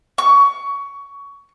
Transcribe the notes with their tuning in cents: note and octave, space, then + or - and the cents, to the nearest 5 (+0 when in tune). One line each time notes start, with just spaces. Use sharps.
C#6 +20